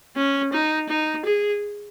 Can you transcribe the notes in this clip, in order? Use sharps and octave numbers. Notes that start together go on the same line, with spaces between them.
C#4
D#4
D#4
G#4